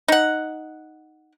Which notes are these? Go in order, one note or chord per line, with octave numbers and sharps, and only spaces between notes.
D#4 F#5